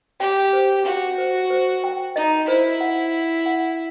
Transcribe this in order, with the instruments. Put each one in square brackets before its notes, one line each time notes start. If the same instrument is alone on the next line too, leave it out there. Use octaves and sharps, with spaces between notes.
[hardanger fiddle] G4 [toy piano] G5
[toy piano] C5
[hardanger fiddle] F#4 [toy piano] G5
[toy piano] C5
C5
G5
[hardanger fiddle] D#4 [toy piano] D#5
[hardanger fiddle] E4 [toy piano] C5
[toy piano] F#5
F#5
F#5